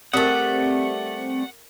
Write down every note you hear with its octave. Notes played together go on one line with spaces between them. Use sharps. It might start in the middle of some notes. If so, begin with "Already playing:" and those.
G3 A3 C4 G#4 A#4 F#5 D#6